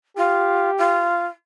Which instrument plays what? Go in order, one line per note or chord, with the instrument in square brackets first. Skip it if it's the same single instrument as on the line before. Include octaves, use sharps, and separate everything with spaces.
[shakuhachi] F4 [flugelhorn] G4
[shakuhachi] F4